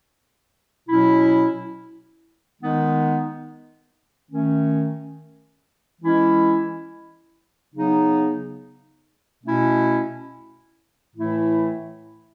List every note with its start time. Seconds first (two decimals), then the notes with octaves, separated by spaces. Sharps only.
0.88 B2 F#3 C#4 E4
2.60 D#3 G#3 B3 D#4
4.30 D#3 A3 C#4
6.02 E3 G#3 C#4 E4
7.72 C#3 F#3 B3 D#4
9.43 B2 A3 C#4 E4
11.15 A2 E3 A3 E4